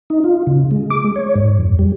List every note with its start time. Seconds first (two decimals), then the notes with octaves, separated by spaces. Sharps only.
0.10 D#4
0.24 F4
0.47 C#3
0.71 G#3
0.90 D6
1.04 G#3
1.16 C#5
1.35 G#2
1.59 F2
1.79 G3